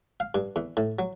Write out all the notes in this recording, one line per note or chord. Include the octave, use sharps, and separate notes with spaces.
F5
G2
E2
A2
F#3